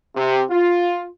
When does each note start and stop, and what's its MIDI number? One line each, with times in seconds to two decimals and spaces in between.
0.16 0.44 48
0.51 1.06 65